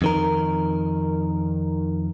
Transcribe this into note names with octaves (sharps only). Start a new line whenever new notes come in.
F2 D#3 A#4